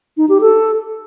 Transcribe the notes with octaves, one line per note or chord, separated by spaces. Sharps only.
D#4
G4
A4